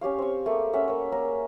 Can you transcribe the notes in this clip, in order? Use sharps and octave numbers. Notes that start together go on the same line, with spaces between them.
C#4 G4 C#5 F5
C4 C#6
A3 A#3 G4 G#4
C#4 E5 F#5
A#3 C#5
A#3 C#4 A#4